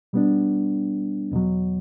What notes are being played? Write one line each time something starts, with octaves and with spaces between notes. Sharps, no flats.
B2 G3 B3 D4
E2 B2 F#3